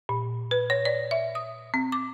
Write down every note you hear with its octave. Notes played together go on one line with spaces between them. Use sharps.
A#2
B4
C#5
D5
E5
D#6
C4
D6